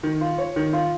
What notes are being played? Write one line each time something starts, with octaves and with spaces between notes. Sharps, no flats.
D#3
F4
C#5
D#3
F4